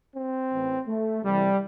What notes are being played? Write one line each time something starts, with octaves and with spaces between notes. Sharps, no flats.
C4
A1 A2 E3
A3
C2 C3 E3 G3